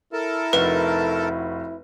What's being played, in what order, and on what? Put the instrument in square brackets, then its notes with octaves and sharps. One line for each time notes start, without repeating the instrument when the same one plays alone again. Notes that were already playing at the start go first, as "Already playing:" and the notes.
[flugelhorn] E4 [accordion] A4 A#4 A5
[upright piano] F1 D#4 F#4 [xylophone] B4